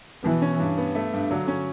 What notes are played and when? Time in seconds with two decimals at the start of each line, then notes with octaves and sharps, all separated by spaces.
0.24 B2 E3
0.42 C#4
0.60 G2
0.78 B3
0.95 A3
1.13 G2
1.31 D3 F#3
1.48 C#4